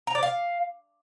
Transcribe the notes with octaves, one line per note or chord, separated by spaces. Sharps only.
A#5
D5
F5